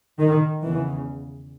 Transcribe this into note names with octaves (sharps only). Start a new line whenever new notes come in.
D#3
E2 C#3 E3